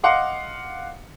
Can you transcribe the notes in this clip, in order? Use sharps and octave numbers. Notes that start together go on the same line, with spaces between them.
D#5 F5 F#5 C6 D6